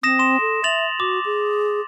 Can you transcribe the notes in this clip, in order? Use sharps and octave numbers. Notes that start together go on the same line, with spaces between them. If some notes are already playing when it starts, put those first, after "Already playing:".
C4 D#6 A#6 E7
C6 E7
A4
E5 A6 F7 F#7
F#4 D6
G#4